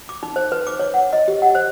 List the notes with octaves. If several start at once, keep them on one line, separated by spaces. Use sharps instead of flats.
D6
D#4
C5
B4
D6
C#5
F#5
D#5
G4
F#5
C5